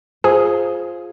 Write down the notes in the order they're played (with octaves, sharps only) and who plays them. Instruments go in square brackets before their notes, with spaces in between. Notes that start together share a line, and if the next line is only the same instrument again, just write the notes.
[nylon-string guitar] F4 C5 [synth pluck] G#4 G#5